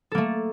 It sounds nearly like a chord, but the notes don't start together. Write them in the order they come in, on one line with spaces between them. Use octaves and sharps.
A4 A#3 A3